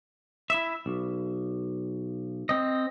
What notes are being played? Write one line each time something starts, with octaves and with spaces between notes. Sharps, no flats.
E4 E5
B1
C4 D#5